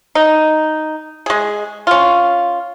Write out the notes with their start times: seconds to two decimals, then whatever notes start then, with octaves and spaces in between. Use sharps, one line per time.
0.15 D#4
1.26 G#3 G#4
1.87 C#4 F4